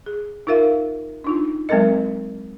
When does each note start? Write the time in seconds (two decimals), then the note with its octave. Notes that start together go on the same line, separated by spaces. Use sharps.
0.06 G#4
0.47 D#4 F4 A#4 E5 F5
1.24 D4 D#4 F4
1.69 F#3 G#3 C4 A4 A#4 D#5